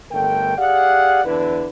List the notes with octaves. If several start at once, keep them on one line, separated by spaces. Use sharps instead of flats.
G1 D3 A3 A#4 G5
G4 G#4 D5 F5 F#5
E2 D3 D4 E4 B4